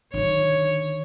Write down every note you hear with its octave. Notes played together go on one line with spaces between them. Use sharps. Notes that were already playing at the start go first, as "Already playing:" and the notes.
D3 D#3 C#5